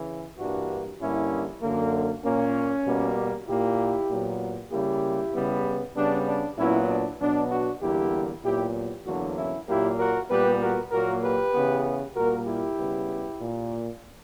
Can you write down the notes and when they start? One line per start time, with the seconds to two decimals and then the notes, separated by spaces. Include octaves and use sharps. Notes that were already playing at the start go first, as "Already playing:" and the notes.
Already playing: C#3 E3
0.38 G2 E3 G3 A#3 D4 F#4
0.99 G2 D3 A#3 C#4 E4
1.61 F#2 D3 A#3
2.23 A#2 A#3 C#4
2.85 B2 G3 A#3
3.47 A#2 A#3 E4 G4
4.10 A#2 F#3 B3
4.71 C#3 G3 A#3 E4 G4
5.34 C#3 G3 B3
5.96 C#3 G3 B3 D4
6.27 D4
6.57 A#2 F#3 B3 C#4 E4
6.88 D4
7.20 B2 F#3 B3 D4
7.51 D4 F#4
7.81 E2 D3 G3 A#3 E4 G4
8.43 A#2 F#3 B3 E4 G4
9.05 E2 D3 F#3 A#3 D4 F#4
9.36 C#4 E4
9.67 A#2 F#3 A#3 E4 G4
9.98 F#4 A#4
10.29 A#2 G3 B3 G4 B4
10.60 F#4 A#4
10.92 A#2 F#3 A#3 F#4 A#4
11.22 G4 B4
11.53 C#3 E3 B3
12.15 A#2 G3 A#3 F#4 A#4
12.47 E4 G4
12.78 C#3 G3 B3
13.39 A#2 A#3